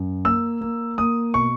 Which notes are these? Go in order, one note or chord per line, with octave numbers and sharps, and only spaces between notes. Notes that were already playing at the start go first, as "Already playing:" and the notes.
Already playing: F#2
A#3 E6
A#3
A#3 D#6
B2 C#6